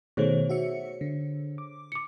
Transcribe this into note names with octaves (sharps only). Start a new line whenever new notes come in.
B2 D#3 A3 G#4 C5 C#5
F#4 E5 C#7
D3
D6
D6 C#7